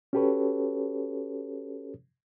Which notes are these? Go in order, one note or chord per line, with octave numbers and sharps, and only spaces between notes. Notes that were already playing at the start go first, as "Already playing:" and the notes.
C#4 F#4 G4 A4 B4 C#5